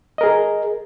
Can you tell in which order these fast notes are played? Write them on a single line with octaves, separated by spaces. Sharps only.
D#5 A#4 G#4